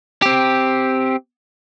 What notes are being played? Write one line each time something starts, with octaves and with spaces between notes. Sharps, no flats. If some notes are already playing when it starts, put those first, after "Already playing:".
C4 G4